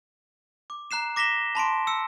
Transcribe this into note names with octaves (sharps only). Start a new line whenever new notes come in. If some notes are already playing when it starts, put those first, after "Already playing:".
D6
A#5 F#6 C7 E7
D6 A#6 B6 E7 G7
A5 B5 C6 D7
E6 C#7